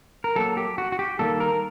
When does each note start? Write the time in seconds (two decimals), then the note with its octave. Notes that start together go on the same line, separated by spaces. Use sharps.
0.24 A#4
0.36 F#3 A#3 A4
0.57 G4
0.78 F#4
0.92 F#4
0.99 G4
1.19 D#3 G3 A#3 A4
1.40 A#4